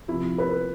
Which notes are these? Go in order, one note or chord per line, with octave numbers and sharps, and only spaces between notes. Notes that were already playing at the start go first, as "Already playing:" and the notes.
C3 F3 E4
B4